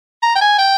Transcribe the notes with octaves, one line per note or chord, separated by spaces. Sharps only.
A#5
G5
G#5
G5